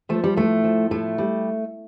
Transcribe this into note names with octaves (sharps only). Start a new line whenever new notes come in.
F3 A3
G3
A2 A3
F3
A2 A3
G3